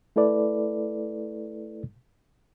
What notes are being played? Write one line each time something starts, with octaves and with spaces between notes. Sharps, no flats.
A3 E4 A4 B4 D5